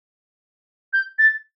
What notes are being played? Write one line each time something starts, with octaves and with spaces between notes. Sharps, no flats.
G6
A6